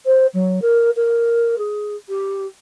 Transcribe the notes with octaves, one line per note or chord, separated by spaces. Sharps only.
C5
F#3
A#4
A#4
G#4
G4